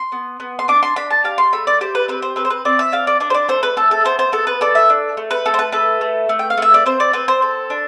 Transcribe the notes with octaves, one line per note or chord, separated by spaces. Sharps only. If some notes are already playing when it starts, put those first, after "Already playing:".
Already playing: C6
B3
B3
C6
D4 D6
C6
D4 B5
A5
G4 F5
C6
A3 B5
D5
G4 C5
B4
C4 B4
C5
C4 B4
C5
B4
C4 D5
E5
D4 F5
D5
D4 D5
C5
D5
A3 C5
B4
A3 A4
A4
B3 C5
C5
B3 A4
B4
A4 D5
E5
D4
A3
B4
A3 A4
C5
B4
A4 B4
A3
A3
G5
F5
A3 E5
D5
C4 C5
D5
C4 B4
C5
A4
D4